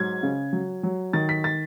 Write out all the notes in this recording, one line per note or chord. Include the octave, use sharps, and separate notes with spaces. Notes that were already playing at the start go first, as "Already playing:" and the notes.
Already playing: G#2 F#3 G#6
C#3
F#3
F#3
D#3 A6
B6
A6